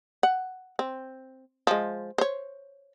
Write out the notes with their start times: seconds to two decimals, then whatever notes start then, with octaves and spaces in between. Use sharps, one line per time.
0.23 F#5
0.79 C4
1.67 F3 G#3
2.18 C5 C#5